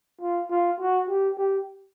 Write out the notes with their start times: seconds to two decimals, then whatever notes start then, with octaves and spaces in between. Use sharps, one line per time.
0.21 F4
0.50 F4
0.80 F#4
1.09 G4
1.38 G4